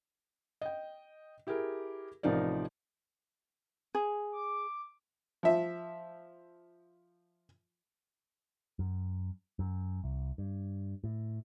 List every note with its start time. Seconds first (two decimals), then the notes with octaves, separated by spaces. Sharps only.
0.61 D#5 G5
1.47 E4 G4 G#4 A#4
2.23 A1 C3 F3 D#4 A#4 D5
3.95 G#4
4.32 D6
5.43 F3 E5
8.79 F#2
9.59 F#2
10.04 C2
10.38 G2
11.04 A2